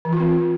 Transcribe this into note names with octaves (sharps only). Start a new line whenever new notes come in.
E3
F4
C4